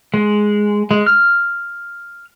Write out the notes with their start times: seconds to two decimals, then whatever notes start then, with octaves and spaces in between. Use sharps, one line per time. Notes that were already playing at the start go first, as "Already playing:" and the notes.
0.14 G#3
0.91 G#3
1.06 F6